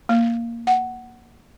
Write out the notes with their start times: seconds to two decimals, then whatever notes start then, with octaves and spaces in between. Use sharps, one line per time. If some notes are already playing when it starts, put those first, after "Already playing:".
0.09 A#3
0.67 F#5